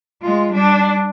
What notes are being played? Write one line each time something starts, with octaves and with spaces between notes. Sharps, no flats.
G#3 F4
G3 D4